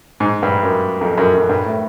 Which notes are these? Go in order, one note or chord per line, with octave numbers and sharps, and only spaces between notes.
G#2
G2
F#2
F2
F#2
F#2
G2
A2